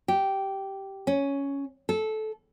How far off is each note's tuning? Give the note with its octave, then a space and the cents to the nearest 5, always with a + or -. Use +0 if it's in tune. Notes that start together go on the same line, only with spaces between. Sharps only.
G4 -10
C#4 +5
A4 -15